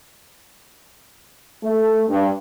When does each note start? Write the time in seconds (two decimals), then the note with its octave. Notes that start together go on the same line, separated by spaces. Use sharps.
1.63 A3
2.09 G2